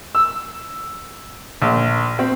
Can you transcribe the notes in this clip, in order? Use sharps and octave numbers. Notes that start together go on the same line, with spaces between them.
E6
A#1
C4